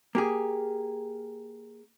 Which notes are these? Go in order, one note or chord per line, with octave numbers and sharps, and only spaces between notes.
A#3 G4 G#4